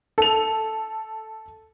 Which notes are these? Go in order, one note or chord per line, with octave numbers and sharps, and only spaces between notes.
A4 F7